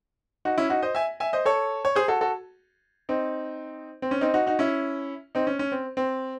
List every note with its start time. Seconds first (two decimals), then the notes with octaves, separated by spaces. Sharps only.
0.45 D#4 F#4
0.58 C#4 E4
0.70 D#4 F#4
0.82 C5 D#5
0.95 E5 G#5
1.20 E5 G#5
1.33 C5 D#5
1.45 A4 C#5
1.85 C#5
1.95 G#4 C5
2.08 F#4 A4
2.21 F#4 A4
3.09 C4 D#4
4.02 C4
4.11 C#4
4.21 C4 D#4
4.34 D#4 F#4
4.46 D#4 F#4
4.59 C#4 E4
5.35 C4 D#4
5.47 C#4
5.59 C#4
5.72 C4
5.97 C4